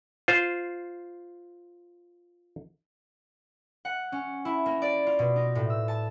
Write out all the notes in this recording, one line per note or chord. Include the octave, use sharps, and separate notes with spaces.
F4 C5
F#5
C#4
E4
A#3
D5
F4
B2
D#4
A2
E6
A5